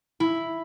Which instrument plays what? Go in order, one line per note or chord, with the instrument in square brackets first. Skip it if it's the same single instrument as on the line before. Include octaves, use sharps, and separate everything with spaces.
[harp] E4